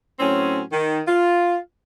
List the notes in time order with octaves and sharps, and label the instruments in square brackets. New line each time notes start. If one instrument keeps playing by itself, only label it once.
[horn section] A2 F#3 C4 C#4
D#3
F4